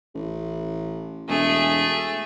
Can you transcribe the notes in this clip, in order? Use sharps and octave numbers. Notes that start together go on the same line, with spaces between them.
A1
E1 A3 G#4